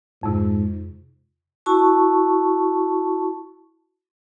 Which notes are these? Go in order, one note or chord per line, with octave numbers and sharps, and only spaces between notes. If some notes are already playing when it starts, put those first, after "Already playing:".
F2 G#2 C3
E4 F#4 A5 C#6